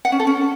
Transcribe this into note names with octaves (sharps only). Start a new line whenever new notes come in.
F#5
C#4
A4
C#4